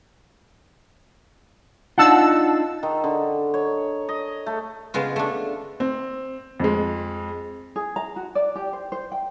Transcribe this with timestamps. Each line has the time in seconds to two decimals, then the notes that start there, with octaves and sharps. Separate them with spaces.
1.98 D4 D#4 F4 F#5 A5 E6
2.83 D#3
3.04 D3
3.54 C#5
4.09 D#5
4.46 A3
4.94 C#3 G#3 B3 F4
5.16 A3 D4
5.80 C4
6.60 F2 G#3
7.76 G#4
7.96 A#5
8.16 F#4
8.35 D5
8.56 G4
8.73 C5
8.92 C5
9.12 G5